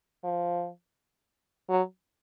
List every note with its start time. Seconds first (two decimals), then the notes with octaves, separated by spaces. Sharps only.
0.24 F3
1.69 F#3